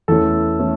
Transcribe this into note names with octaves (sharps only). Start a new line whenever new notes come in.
E2 E3 A3 C#4 A4
E3 A3 C#4